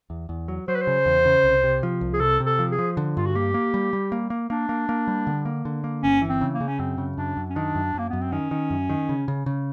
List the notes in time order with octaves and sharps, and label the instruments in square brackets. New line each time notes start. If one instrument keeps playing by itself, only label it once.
[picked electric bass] E2
E2
F#3
[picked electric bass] F#3 [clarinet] C5
[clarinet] B4
C5
[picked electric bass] C#3
E2
C#3
C2
C3
F3
C2
[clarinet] G#4
[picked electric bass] C3 [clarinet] A4
[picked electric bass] C3
[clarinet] A4
[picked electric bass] F3
[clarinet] G#4
[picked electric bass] F3
D3
[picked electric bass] G2 [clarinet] F4
[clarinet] F#4
[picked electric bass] A#3 [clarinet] G4
[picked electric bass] A#3
G3
G3
A#3
A#3
[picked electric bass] A#3 [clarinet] D4
[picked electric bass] A#3
A#3
G3
D3
A#3
D3
A#3
[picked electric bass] G1 [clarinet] C#4
[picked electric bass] E3
[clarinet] C4
[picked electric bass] C#3
[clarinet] A#3
[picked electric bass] C#3
[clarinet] C#4
[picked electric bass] F#2 [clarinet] C4
[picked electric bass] C#3
[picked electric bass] F#2 [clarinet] D4
[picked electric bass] F#2
[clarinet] C#4
[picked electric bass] D#3 [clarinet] D4
[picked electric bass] F#2
[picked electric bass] F#2 [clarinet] A#3
[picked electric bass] F#2 [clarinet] B3
[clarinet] C4
[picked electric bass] D#3 [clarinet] C#4
[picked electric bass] D#3
F#2
D#3
C#3
C#3
C#3